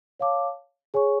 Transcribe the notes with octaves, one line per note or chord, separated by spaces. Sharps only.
C#5 F5 A5 D6
G#4 C#5 G#5 C#6